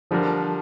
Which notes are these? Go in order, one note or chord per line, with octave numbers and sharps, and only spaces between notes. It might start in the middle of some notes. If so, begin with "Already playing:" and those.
D3 F3 G3 D4 A#4